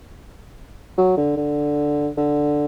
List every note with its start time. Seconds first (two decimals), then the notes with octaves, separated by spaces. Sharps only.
0.97 F#3
1.17 D3
1.37 D3
2.17 D3